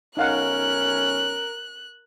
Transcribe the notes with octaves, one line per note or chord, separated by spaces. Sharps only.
B1 C#4 D#4 A#4 F5 F#5 F#6